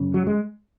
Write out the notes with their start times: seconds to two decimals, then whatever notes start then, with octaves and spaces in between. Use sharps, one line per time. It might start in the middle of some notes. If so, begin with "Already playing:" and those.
Already playing: F#2 C#3
0.14 F#3
0.27 G#3